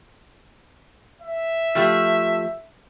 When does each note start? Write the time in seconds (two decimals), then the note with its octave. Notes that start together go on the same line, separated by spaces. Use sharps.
1.22 E5
1.75 F3 A3 G4